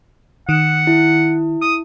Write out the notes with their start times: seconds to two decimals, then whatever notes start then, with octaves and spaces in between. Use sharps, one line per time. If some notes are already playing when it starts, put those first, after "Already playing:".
0.49 D#3 F#5
0.87 E4
1.62 D#6